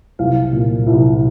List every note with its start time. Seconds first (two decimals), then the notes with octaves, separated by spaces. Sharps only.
0.19 C2 F5
0.53 A#2
0.87 C2